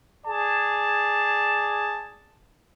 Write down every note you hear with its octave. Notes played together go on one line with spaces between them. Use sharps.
G#4 D5 A5